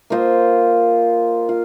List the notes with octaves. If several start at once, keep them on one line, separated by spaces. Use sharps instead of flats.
A#3 F4 C5 D#5
F4